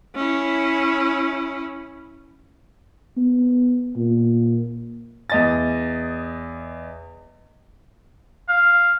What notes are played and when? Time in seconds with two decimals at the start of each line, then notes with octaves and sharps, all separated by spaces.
0.15 C#4 E4
3.17 B3
3.96 A#2
5.30 E2 D#5 A6
8.49 F5